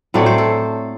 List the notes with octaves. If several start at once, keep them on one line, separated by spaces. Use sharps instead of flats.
A2 F#3 A3 C4 D5
C5
A4